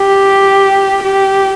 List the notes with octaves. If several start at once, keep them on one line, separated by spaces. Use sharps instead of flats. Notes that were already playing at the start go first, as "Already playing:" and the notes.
Already playing: G4
G4